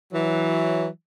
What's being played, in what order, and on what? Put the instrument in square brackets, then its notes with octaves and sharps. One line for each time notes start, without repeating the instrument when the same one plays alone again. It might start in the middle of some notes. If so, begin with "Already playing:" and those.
[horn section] E3 F#3